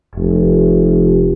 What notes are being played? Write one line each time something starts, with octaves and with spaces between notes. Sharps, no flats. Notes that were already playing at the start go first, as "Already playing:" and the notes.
F1